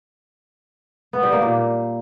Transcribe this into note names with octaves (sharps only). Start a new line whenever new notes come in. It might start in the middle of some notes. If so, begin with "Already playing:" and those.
B3
G3
A#3
A#2